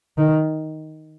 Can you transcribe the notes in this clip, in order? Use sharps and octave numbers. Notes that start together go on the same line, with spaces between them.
D#3